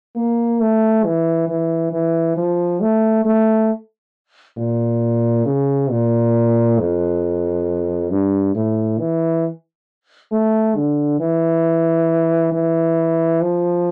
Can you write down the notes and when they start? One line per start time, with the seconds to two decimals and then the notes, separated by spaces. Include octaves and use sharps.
0.16 A#3
0.60 A3
1.05 E3
1.48 E3
1.92 E3
2.37 F3
2.81 A3
3.25 A3
4.57 A#2
5.45 C#3
5.90 A#2
6.79 F2
8.11 G2
8.55 A2
8.99 E3
10.32 A3
10.76 D3
11.20 E3
12.52 E3
13.41 F3